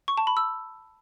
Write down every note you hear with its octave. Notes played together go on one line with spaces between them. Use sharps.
C#6
A5
B5
E6